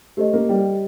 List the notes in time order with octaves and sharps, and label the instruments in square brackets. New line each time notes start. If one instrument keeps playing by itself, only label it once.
[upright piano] A3 [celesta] G4 C5 D#5
[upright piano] A#3
G3